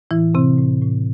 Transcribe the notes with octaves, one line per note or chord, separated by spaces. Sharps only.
A2 E3 E4
A2 C3 C4
A2
A2